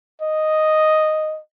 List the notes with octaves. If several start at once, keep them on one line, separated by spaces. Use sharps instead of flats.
D#5